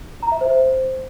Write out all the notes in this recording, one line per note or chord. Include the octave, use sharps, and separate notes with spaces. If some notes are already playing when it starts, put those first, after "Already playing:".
A#5
E5
C5